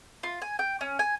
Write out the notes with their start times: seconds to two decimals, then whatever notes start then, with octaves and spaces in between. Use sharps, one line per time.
0.23 F4
0.42 G#5
0.59 G5
0.81 C#4
0.99 G#5